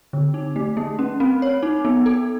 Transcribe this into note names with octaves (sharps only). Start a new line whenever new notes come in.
D3
D#4
A3
A#3
C#4
C4
C#5
D#4
B3
A4